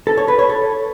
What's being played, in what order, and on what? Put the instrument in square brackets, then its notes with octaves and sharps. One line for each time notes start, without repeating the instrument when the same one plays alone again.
[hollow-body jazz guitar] A4
C#5
B4
C#5
A4